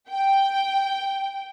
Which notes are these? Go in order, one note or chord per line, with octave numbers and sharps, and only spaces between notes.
G5